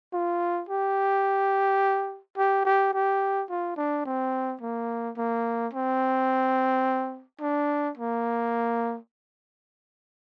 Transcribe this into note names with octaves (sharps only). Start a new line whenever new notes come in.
F4
G4
G4
G4
G4
F4
D4
C4
A#3
A#3
C4
D4
A#3